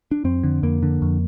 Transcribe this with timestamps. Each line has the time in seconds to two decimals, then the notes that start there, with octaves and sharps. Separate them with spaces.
0.11 D4
0.24 F2 C4
0.43 D3
0.63 F2 A#3
0.83 D3
1.02 F2